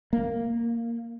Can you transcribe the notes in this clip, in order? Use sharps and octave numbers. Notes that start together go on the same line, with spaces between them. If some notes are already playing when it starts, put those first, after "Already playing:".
A#3